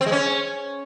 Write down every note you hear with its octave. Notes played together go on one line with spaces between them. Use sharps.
C4
G#3
C#4